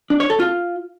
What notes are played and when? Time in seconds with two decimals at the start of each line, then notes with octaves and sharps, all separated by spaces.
0.10 D4
0.20 C#5
0.30 A4
0.40 F4